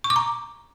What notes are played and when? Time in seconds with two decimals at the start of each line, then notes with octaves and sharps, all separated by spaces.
0.04 C#6
0.10 D6
0.16 A#5